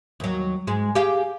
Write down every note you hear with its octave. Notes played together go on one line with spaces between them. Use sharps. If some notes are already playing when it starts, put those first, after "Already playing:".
D#2 F#3
G#2 G#3
G4 G#4 F5